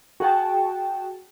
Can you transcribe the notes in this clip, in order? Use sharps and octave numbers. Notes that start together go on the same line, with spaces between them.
F#4 G#4 F#5 G5 A5